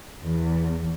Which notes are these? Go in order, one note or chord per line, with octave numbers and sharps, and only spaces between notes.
E2